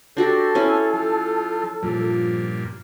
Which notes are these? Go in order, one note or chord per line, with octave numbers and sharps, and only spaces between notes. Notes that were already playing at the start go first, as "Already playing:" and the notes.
D4 F#4 G4 A4 C5
C#4 E4
F3
G2 A#2 F3